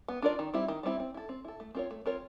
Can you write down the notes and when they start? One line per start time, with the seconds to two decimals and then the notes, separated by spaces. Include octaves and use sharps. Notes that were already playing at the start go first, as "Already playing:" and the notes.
0.08 B3
0.22 D4 F4 A#4 D5
0.39 D#3
0.53 G3 C4 E4
0.68 D#3
0.83 G3 C4 E4
1.00 C4
1.14 E4 A4
1.29 C4
1.45 E4 A4
1.60 A3
1.75 C4 F4 A#4 C#5
1.91 A3
2.06 C4 F4 A#4 C#5